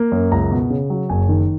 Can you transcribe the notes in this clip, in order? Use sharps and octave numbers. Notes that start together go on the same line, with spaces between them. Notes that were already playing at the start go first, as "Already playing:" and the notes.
Already playing: A#3
F#2
C#2 A#5
B2
C#3
F#3
F#1 G#5
D#3